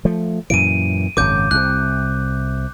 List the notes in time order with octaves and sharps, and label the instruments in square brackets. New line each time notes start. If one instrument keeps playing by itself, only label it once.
[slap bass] F3 A3
[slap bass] F#2 A#2 E3 [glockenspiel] D7 D#7
[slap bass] G#1 F#2 C#3 [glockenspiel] D6 G6
[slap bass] C2 C3 [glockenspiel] F#6